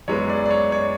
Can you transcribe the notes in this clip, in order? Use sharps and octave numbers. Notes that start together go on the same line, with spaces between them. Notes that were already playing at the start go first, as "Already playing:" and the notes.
F#2 E3 G#3 B3 C#5
D5
D5
C#5
C#5